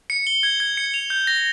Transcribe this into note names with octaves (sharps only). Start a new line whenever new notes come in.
C#7
G7
G#6
G#6
C#7
F7
G6
A#6